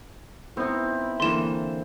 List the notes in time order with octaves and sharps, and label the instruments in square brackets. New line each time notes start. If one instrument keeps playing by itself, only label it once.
[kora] B3 D#4 [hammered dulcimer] C4 [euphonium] E4
[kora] D3 E3 A#3 [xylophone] C6 E7